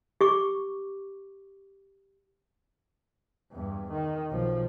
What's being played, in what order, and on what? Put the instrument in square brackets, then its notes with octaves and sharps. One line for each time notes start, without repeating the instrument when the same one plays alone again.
[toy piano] G4 C#6 D6
[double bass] E2 G2
D#3
B1 F3